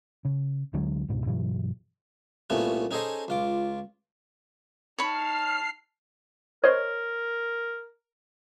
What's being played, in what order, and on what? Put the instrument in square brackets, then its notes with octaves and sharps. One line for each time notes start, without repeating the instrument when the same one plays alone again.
[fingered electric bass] C#3
D2 D3 F#3 G#3
C#2 G#2 B2
G2 B2 E3 F#3
[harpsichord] C2 A#2 A3 B3 C#4
C#4 D#4 G#4 A4 C5 D#5
C#2 F4 D6
[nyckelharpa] D#4 A5 [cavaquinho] C#5 B5 [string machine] F6 C7
[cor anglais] A#4 [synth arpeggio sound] C5 D#5 [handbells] C#5